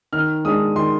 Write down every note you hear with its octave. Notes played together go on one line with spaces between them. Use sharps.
D#3 F6
G#3 D4 D#6
D#3 C6